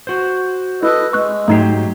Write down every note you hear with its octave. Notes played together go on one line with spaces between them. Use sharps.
F#4 C5
E4 A4 B4 D#5
G#3 C#6 F#6
G#2 F#3 A3 D#4 G4 C7